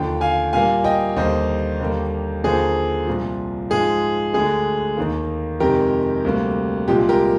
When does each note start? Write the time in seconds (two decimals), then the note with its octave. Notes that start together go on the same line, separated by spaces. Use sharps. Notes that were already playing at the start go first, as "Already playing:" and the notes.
Already playing: D#2 D3 F3 G5
0.21 F5 G#5
0.53 A#2 G3 A#3 F5 G#5
0.84 D#5 G5
1.16 D#2 D3 G3 A#3 C5 D#5
1.80 D#2 D3 G3 A#3
2.44 D#2 D3 F3 A#3 G#4 C5
3.07 C2 A#2 F3
3.70 G#2 F3 G#3 G#4
4.33 D2 D3 G#3 G#4
4.97 D#2 D#3 A#3
5.60 F2 C3 D#3 G#3 G4 A#4
6.24 D2 C3 G3 A#3
6.88 C2 A#2 F3 G#3 G4
7.09 G4 A#4